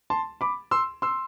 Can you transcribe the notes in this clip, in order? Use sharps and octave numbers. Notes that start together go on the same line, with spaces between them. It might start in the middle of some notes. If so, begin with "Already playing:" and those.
A5 C6
B5 D6
C6 E6
C6 E6